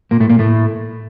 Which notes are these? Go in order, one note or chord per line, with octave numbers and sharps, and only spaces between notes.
A#2 A#3
A2 A3
A#2 A#3
A2 A3